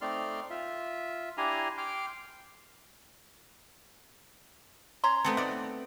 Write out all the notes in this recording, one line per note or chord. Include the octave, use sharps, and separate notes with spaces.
A3 C4 D#4 D5 C6 F6
F4 E5
D4 E4 G4 G#5 A#5 C6
G5 C6 D6 F6
C#4 A#5 C6
A3 B3 C4 A4
D#4 D5 F#5